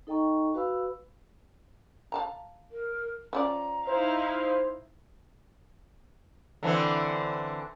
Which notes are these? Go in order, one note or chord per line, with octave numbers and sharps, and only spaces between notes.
D#4 A4 D#5 G5 A#5 C#6
F#4 B4 F5 B5 E6
F5 A5 A#5
A#4
F3 C#4 D5 A#5
D#4 E4 C5 F5
D3 E3 C4